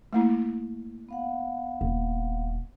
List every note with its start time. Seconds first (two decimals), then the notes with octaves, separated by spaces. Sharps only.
0.13 A3 A#3 E4
1.09 B3 F5 F#5
1.81 D#1